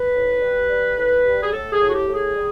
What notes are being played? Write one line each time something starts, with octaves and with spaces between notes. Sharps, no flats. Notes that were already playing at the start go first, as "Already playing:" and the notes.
Already playing: B4
A2
G3
G3
A2
G3
G#4
A2 A4
G#4
A2
F#4
G4
A2
G#4
G3